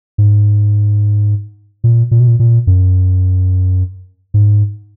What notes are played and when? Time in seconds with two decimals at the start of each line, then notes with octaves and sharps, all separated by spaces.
0.18 G#2
1.84 A#2
2.11 A#2
2.20 B2
2.27 A#2
2.39 A#2
2.67 F#2
4.34 G#2